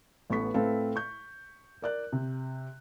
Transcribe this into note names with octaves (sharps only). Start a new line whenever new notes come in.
A1 B3 A4 C#6 B6
A2 A3 C4 A4 B4 F5
C#6 G6
A#4 D5 F#6
C3